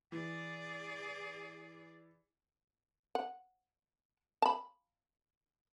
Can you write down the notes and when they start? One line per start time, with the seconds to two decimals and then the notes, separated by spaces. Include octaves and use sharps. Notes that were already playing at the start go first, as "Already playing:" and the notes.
0.12 E3 G#4 D5
3.15 F#5
4.42 A5 B5